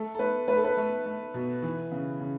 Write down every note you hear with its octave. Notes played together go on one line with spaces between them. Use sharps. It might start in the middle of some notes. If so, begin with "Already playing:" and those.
Already playing: A3 A4
A4
A3 B4
A3 B4
A4
B4
A3
A3
B2
E3
C#3
C#3